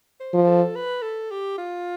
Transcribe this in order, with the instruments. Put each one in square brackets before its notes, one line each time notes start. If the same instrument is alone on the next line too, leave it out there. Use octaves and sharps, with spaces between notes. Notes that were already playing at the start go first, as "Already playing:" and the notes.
[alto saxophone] C5
[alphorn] F3
[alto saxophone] A4
B4
A4
G4
F4